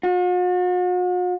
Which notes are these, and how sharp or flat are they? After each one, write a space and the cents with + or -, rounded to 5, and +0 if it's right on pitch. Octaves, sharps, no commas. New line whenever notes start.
F#4 -45